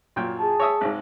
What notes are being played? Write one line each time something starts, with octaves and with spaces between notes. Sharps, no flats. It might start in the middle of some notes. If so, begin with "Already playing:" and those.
F#2 A#2 G5
G#4 A5
C#5 E5 D#6
G#1 G#2